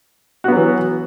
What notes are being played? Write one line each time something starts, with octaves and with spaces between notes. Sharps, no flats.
E3 F#3 B3 F#4